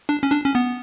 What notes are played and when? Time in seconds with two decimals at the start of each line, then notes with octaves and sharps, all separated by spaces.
0.09 D4
0.23 C#4
0.32 D4
0.44 C#4
0.55 B3